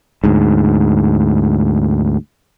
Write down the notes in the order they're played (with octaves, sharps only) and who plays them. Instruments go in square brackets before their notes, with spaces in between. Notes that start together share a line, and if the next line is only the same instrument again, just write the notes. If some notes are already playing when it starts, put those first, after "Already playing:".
[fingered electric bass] D2 G#2